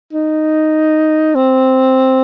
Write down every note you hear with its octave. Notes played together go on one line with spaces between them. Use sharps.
D#4
C4